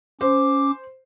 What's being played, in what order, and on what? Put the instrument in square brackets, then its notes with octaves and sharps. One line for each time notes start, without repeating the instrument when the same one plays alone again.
[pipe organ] C#4 D6 [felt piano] C5